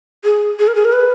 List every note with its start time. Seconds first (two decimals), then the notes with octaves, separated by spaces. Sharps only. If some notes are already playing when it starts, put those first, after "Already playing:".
0.24 G#4
0.59 G#4
0.68 A#4
0.75 G#4
0.85 A#4
0.92 B4